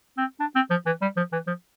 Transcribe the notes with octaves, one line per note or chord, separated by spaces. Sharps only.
C4
D4
C4
F3
E3
G3
F3
E3
F3